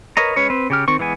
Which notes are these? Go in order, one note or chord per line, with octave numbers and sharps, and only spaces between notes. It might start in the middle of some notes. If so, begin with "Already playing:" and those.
A#4 B4 C#5 D#5 A#5
G#3 C#4 B4 C#5
C4 B4
C#3 G4 F6
D#3 C4 C#6
E3 G#3 B3 G#5